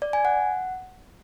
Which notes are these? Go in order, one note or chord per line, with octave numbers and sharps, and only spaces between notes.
D5
G#5
F#5